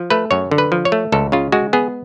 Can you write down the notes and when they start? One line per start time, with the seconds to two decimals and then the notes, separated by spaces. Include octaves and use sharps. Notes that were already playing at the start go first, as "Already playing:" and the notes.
Already playing: F3
0.10 A3 B4
0.31 F#2 C#5
0.51 D3
0.58 B4
0.72 F3
0.85 C#5
0.92 A3
1.12 C#2 A4
1.32 C#3 F4
1.52 G#3 F#4
1.73 B3 G#4